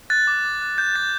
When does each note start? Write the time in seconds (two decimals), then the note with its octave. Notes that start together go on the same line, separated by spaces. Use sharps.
0.10 F#6 A6
0.27 D6
0.45 D6
0.61 F#6
0.78 F#6 G6
0.96 D6 A6